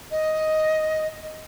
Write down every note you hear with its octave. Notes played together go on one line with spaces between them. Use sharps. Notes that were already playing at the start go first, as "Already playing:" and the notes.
D#5